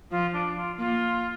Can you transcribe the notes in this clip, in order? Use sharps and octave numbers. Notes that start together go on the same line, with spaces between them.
F3 F4
D4
F4
A#3 F4